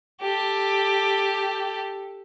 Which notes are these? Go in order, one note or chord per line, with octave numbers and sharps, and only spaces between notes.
G4 A4